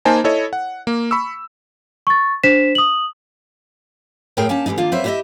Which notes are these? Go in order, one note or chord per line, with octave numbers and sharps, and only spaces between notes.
A#3 D#4 C5 G#5 A5
E4 A4 C#5 D#5
F#5
A#3
B5 C#6 E6
C#6 A6
D4 C5 B6 E7
D#6 F#7
A2 F#3 E4 G#4 A#4 G5
A#3 C#4 D4 G5 A5
D3 E3 G3 G#3 D#4
D#3 A#3 D4 F4
F#3 A#3 C4 B4 C5 E5
E4 G4 B4 C#5 D#5 E5